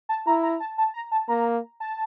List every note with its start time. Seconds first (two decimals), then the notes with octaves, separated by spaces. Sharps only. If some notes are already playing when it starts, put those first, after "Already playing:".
0.09 A5
0.27 E4 A#5
0.43 A#5
0.60 A5
0.78 A5
0.94 A#5
1.12 A5
1.28 A#3 A#5
1.80 A5